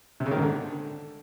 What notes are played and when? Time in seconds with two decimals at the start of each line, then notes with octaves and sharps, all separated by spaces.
0.20 C3
0.26 C#3
0.31 D#3
0.37 G#2
0.42 D3